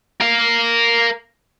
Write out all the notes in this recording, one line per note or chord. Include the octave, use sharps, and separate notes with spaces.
A#4 F5